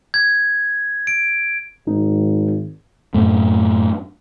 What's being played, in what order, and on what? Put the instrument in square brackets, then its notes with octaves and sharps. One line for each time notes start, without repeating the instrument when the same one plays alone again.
[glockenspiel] G#6
D7
[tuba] G#1 [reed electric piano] D#4
[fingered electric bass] F#2 A2 A3